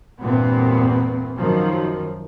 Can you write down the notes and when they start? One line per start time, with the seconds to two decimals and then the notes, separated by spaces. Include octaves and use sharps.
0.21 E2 G2 A#2 B3 C4
1.37 F#2 D#3 F3